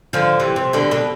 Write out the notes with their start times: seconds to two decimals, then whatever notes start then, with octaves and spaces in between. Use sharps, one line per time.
0.13 D3 F3
0.40 C3 E3
0.56 C3
0.73 B2 D3
0.91 B2 D3